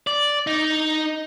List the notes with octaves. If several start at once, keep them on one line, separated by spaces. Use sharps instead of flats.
D5
D#4